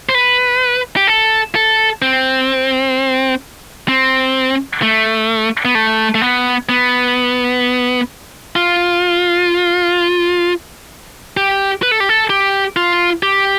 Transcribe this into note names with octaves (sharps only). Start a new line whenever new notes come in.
C5
B4
G4
A4
A4
C4
C4
A3
B3
A3
A3
B3
B3
F4
G4
B4
A4
G4
A4
G4
F4
G4